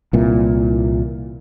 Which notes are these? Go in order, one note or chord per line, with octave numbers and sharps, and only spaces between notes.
C2 A#2 E3